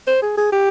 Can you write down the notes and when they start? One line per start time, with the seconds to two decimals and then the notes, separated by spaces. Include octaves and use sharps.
0.07 C5
0.22 G#4
0.37 G#4
0.52 G4